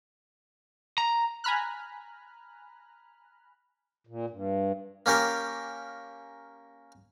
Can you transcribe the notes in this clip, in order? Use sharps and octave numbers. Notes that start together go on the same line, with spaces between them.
A#5
G#5 A#5 B5 F6 F#6
A#2
G2
A#3 C#4 G4 A#4